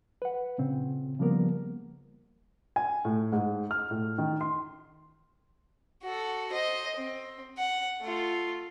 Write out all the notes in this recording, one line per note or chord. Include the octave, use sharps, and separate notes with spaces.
B4 F#5
A#2 C#3 C4
C#3 F3 G3 A#3 B3 A#4
G#5
A2
G#2
F6
A2
D#3
C6
F#4 A4
C5 D#5
C4
F#5
A3 F4